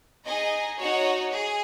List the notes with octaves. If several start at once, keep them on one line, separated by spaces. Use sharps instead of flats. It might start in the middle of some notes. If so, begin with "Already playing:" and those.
D#4 G#4 D#5 G#5
D#4 F#4 C#5 F#5
G#4